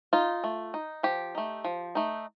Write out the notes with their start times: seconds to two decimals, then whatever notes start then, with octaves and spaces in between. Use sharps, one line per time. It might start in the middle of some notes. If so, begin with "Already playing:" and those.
0.13 D#4 F4
0.44 A3
0.74 D#4
1.03 F3 G4
1.35 A3 D#4
1.64 F3
1.95 A3 D#4